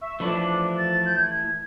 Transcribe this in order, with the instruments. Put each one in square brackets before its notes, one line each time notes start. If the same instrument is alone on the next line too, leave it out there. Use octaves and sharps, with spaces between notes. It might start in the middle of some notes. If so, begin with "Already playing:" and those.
[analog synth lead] E5 [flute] C#6
[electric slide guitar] E3 A3 E4 [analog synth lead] F3 [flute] D4
[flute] A6
G6
G#6